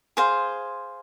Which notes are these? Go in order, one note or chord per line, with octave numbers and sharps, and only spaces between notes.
G#4 C5 F5